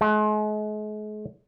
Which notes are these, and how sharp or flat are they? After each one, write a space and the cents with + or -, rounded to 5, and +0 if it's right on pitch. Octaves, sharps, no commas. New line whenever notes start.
G#3 +40